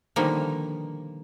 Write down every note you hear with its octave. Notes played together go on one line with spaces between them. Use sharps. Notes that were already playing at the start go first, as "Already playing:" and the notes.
B2 D3 D#3 F3 G3 A#3